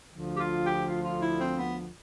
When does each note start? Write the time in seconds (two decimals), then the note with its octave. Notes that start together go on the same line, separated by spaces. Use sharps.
0.11 D2 D3 F3
0.34 G4
0.39 F4
0.67 G4
0.84 F4
1.03 F4
1.21 E4
1.39 C4
1.58 B3